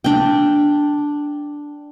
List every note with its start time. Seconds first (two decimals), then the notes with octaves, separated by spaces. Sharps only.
0.04 D4 G5